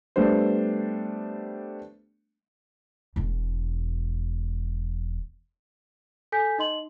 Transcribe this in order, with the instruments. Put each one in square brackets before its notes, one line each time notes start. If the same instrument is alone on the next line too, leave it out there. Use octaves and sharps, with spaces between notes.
[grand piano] G3 A3 B3 D4 C5
[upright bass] E1 E2
[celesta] A4 G#5 G6 B6
D#4 D#5 C6 F#7